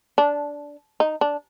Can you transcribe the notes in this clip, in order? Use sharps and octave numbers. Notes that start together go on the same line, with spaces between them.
D4
D#4
D4